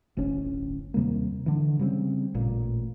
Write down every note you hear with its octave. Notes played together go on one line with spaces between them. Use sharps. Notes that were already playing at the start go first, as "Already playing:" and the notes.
D1 G1 C#4
D#2 C3 G3 A#3
D3 E3
C#3 G3 A3 C4
A1 A#2